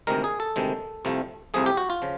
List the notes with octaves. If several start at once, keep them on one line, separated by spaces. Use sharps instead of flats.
D2 C3 D#3 G#3 A#4
G#4
A4
D2 C3 D#3 G#3
C2 C3 F3 A3
C2 C3 F3 A3 G#4
G4
F#4
F4
C#3 F3